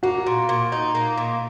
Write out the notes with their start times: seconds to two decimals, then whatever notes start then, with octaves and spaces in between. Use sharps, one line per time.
0.03 A#3 F#4
0.26 A#2
0.49 A#2
0.72 D#4
0.95 A#3
1.17 A#2